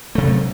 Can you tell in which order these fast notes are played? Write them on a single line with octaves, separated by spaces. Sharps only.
A3 C3 F#3